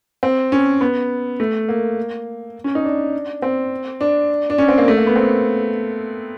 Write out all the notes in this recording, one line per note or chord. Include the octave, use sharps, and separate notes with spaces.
C4
C#4
B3
A3
A#3
C#4
D#4
D4
C4
D4
D4
C#4
C4
A#3
A3
A#3
B3
C4